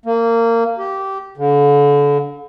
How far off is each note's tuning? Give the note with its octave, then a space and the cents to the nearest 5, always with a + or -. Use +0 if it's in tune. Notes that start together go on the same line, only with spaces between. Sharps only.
A#3 -20
G4 -15
D3 -35